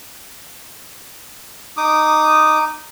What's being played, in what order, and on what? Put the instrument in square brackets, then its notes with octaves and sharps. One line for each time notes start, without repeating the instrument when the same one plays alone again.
[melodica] D#4 D6 D#6